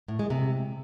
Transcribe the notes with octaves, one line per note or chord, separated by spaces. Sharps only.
A2
G#3
C3